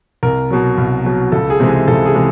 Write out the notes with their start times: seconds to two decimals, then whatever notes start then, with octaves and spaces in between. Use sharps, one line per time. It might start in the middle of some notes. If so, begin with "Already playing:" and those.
0.23 C2 A#4
0.50 B2 F#3
0.78 C2
1.05 B2 F#3
1.32 C#2 A4
1.50 G#4
1.60 C3 E3 G#3
1.68 G#4
1.88 C#2 A4
2.05 G#4
2.15 C3 E3 G#3